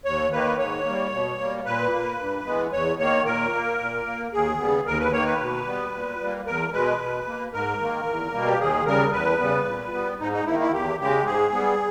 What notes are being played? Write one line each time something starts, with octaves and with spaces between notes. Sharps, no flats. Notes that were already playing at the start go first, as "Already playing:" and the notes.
D#2 C#5
D#3 A#3 B4
G#2 C#5
G3 A#3
B2
G3 A#3
A#2 B4
A#3
G2
E3 G#3 B3
E2 C#5
D#3 A#3 C#5
A#2 A#4
A#3
A#2
A#3
D#2 G#4
C#3 G3 B3
D#2 A#4
B4
D#3 A#3 C#5
B4
B2
G3 B3
A#2
G3 A#3
E2 A#4
B2 G#3 B4
B2
A#3
G#2 A#4
D#3 A#3
E2
B2 G3 A#3
G4
D#2 G#4
C#3 G3 A#4
E2 B4
C#3 G3 B3
A#2
G3 B3
G#2 D#4
D#4
D#3 A#3 E4
E4
E2 G4
C#3 G#3 G4
G#2 G#4
G3 B3